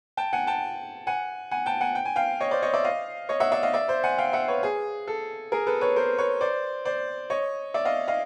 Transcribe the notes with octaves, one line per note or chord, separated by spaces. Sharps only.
G5 A5
F#5 G#5
G5 A5
F#5 G#5
F#5 G#5
G5 A5
F#5 G#5
G5
G#5
F5 G5
C#5 D#5
C5 D5
C#5 D#5
D5 E5
D#5 F5
C#5 D#5
E5 F#5
D5 E5
D#5 F5
D5 E5
C5 D5
F#5 G#5
F5 G5
E5 F#5
B4 C#5
G#4
A4
G#4 A#4
A4 B4
B4 C#5
A#4 C5
B4 C#5
C5 D5
C5 D5
C#5 D#5
D5 E5
D#5 F5
D#5 F5